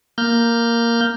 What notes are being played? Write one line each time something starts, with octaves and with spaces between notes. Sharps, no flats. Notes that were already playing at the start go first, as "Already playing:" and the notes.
A#3 F6 G6